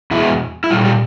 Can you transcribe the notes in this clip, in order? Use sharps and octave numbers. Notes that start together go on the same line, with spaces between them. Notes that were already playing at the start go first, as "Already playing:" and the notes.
E2 B2 G#3 E4
E4
A#2 G3 F4
G4